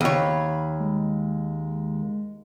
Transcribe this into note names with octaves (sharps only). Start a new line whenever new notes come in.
D#2 C#5 B5
G#3